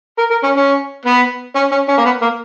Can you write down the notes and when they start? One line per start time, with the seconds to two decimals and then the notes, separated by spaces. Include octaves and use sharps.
0.18 A#4
0.31 A#4
0.44 C#4
0.56 C#4
1.06 B3
1.56 C#4
1.71 C#4
1.88 C#4
1.98 A#3
2.05 B3
2.22 A#3